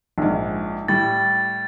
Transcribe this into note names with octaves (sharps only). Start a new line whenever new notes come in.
A#1 G#2
A2 G3 A6